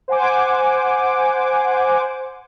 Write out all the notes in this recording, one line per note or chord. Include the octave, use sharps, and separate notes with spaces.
C5 F#5 G#5 D6